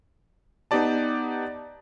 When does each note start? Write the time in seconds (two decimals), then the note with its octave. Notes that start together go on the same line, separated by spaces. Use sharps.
0.71 B3 D#4 G4 D5 A5